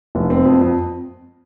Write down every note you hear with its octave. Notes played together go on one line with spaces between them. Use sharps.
F1
C4
F2
F2